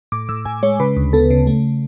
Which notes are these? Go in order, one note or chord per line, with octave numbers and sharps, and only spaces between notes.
A2 D6
A2 E6
A2 G#5
G#3 C#5
C#3 B4
D2
B3 A4
C#3
A3